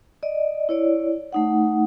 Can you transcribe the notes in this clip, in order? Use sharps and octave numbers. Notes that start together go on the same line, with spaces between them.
D5 D#5
E4 C#5 D5
A3 D#4 F#5